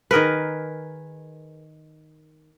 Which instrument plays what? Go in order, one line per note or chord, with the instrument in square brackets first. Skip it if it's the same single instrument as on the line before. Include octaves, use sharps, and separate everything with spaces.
[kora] D#3 G#4 A#4 B4